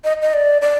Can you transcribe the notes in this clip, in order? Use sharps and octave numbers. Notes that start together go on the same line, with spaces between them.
D#5
D#5
D5
D5